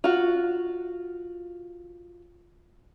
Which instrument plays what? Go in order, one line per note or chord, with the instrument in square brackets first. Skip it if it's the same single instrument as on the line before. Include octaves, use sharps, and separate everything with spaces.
[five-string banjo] F4 F#4